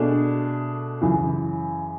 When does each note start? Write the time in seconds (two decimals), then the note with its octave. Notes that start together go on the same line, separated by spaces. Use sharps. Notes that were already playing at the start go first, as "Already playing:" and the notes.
Already playing: B2 A3 D4 G#4
1.02 F#2 C#3 E3